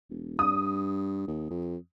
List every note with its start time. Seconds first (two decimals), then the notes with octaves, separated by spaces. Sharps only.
0.10 E1
0.39 G2 D#6
1.28 D#2
1.50 F2